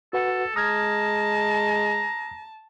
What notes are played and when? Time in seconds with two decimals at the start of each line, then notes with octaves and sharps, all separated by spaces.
0.13 F#4 A4 B4 F#5
0.56 G#3 A5 A#5 D#6 F6 G#6